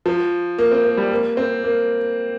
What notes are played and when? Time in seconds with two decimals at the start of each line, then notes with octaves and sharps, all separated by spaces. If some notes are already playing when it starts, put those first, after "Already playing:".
0.06 F3
0.58 A#3
0.72 C4
0.85 A#3
0.97 G3
1.11 A#3
1.37 C4
1.64 A#3